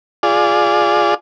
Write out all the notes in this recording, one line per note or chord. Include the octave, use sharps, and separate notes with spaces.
F4 G#4 D5